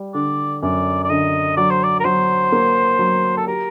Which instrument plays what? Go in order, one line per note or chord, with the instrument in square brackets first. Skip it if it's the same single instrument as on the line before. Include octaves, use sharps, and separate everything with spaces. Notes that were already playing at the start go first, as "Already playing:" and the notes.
Already playing: [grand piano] G3
[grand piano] D3 [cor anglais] D5
[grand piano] F#2 [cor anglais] D5
[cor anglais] D5
[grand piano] D3 [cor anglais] D#5
[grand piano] F#3 [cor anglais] D5
[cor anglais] C5
D5
A#4
[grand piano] F#3 [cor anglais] C5
[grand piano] A#3
F#3
[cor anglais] A4
[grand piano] G4 [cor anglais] A#4